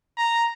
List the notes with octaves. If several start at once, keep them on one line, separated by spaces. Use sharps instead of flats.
A#5